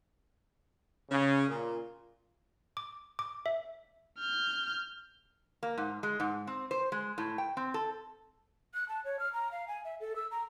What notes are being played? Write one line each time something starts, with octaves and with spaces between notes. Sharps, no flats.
C#3
A#2
D6
D6
E5
F6 G6
A#3
G#2
G#3
G#2
C4
C5
G#3
A2
G5
C4
A4
F#6
A5
C#5
F6
A#5
F5
G#5
E5
A4
E6
A#5